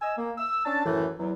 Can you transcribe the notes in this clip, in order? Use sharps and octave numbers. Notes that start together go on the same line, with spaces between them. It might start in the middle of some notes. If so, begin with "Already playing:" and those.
D#5 G#5 E6
A#3
E6
C#4 D4 A5
F#2 A2 E3
E2 F#3